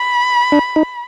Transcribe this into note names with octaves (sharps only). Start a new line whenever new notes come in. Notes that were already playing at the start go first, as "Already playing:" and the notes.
Already playing: B5
D4
D#4